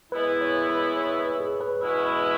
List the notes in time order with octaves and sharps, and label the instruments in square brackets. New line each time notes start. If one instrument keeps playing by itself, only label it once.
[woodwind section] E3 G#3 B3 E4 [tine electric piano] B4
[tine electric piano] C#5
B4
C#5
B4
G#4
B4
[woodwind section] E2 B2 G#3 C#4 E4 [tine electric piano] B4